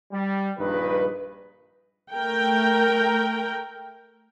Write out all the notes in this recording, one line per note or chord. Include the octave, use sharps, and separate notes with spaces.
G3
A#1 G2 A#2 D#3 G#3 B4
A3 A#4 G5